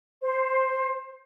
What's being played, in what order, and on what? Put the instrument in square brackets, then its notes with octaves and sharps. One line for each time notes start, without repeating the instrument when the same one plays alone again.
[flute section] C5